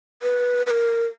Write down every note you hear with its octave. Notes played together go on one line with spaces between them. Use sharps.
B4
B4
A#4